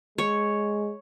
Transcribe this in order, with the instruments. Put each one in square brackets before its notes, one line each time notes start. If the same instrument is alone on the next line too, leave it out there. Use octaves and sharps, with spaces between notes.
[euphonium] G#3 [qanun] C#5